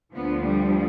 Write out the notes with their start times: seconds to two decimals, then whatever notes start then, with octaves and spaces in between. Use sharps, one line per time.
0.14 D2 D3 F3 B3
0.43 G3